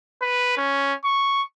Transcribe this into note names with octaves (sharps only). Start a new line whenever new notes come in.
B4
C#4
C#6